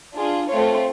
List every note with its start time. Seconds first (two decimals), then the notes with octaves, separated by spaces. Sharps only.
0.14 D4 F4 G#4
0.48 A3 C4 F4 C#5